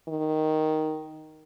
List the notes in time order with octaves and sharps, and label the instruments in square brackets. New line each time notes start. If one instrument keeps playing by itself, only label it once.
[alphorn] D#3